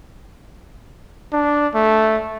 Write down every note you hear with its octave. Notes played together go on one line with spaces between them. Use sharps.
D4
A3